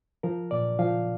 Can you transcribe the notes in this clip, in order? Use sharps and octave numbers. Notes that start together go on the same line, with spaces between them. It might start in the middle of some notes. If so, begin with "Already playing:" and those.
F3 A#4
A#2 D5
F3 F5